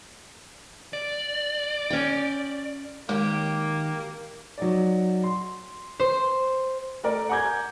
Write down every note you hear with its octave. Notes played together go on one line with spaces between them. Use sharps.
D5
C#4 G5
D#3 G#3 A#3 G4 C#5 D6
F#3 D#4 D5
C6
C5
A3 A#4 D5
F#5 G#5 A#5 D6 G6 G#6